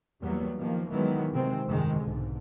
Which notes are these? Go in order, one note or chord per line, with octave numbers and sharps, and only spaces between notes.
E2 F#3 G3 A#3 B3
D#3 F3 A#3
B2 D#3 E3 F#3 G#3 B3
C3 D#3 G#3 C4
G1 F2 C3 D#3 G#3
B1 G#2 D3